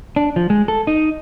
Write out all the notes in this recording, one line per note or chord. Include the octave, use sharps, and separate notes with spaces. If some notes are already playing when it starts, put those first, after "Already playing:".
D4
F3
G#3
A4
D#4